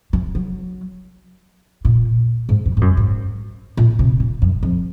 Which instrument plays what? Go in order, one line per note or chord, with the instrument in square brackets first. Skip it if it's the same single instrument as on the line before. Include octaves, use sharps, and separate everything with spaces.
[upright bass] F#3
F#3
A#2
G#2
F#2
G#2
F#2
G#2
A#2
C3
A#2
F#2
F2